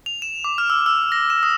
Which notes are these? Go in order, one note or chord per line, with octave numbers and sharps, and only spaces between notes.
F7
E7
D6
F6
E6
E6
A#6
E7
D#6